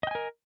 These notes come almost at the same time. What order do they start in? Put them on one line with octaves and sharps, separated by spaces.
D#5 G5 G#5 A#4